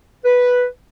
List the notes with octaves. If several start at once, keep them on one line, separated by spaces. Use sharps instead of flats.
B4